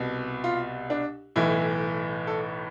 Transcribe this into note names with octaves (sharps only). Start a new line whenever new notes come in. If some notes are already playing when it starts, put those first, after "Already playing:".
Already playing: C2 B2
F4
D4
B1 A2 E3 E4
A4